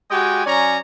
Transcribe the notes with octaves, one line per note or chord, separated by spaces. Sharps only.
G#3 F#4 G4 D#5 G5 G#5
F#3 C#4 C#5 D5 G#5 A#5